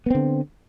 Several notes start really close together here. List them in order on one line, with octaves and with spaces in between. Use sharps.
B3 C4 D3